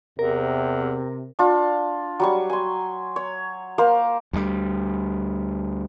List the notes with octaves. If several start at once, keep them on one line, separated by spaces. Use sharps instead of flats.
E2 C3 A#4
D4 F4
F#3 G3 C#6
G#5 C6
C#5
A#3 A#4 C5 F5
D2 G3